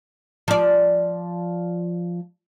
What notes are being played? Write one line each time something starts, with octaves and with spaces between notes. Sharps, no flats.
F3 D5